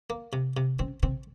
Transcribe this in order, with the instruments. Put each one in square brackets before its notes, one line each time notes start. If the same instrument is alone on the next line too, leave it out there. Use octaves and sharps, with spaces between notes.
[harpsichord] A#3
C3
C3
[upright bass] C#3 [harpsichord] C4
[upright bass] C3 [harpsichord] C4